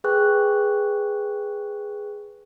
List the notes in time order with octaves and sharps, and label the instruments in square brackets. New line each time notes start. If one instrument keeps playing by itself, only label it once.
[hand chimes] G#4 B4 G5 C#6 F#6